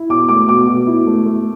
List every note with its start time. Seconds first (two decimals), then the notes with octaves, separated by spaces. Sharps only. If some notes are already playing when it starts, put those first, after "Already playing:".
Already playing: E4
0.09 B2 D6
0.29 A3 D6
0.49 B2 D6
0.68 B2
0.87 E4
1.07 A3
1.26 A3